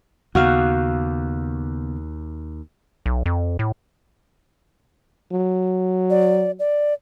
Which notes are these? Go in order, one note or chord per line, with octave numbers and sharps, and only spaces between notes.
D#2 C#3 B3 F#4 F5
B1
F2
A2
F#3
D5
D5